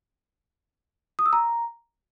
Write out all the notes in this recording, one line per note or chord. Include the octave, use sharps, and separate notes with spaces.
D#6
E6
A#5